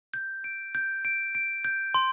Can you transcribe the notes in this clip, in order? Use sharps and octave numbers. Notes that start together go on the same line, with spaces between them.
G6
D7
G6
D7
D7
G6
C6